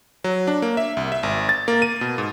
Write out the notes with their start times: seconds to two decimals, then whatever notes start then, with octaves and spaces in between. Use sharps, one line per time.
0.24 F#3
0.47 D4
0.62 A#3
0.77 E5
0.97 C2
1.12 E5
1.23 G#1
1.49 A6
1.68 A#3
1.82 D#7
2.01 B2
2.18 G#2